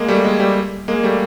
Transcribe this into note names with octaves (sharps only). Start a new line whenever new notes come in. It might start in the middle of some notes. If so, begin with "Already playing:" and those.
Already playing: G#3 A#3
G3 A3
G#3 A#3
G3 A3
G#3 A#3
G3 A3